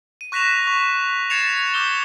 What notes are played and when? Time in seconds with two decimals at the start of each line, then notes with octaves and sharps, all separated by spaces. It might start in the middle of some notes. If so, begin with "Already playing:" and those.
0.21 D#7
0.32 C#6 F#6 A#6 B6 E7 F7
0.67 C#6
1.30 G#6 A6 C7 C#7 E7 F7
1.74 D6 E6 G6 G7